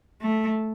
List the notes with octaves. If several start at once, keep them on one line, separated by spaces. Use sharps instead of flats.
A3